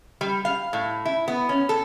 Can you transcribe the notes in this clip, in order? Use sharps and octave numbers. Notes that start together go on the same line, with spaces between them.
G3
F5
A2
E4
B3
C#4
A4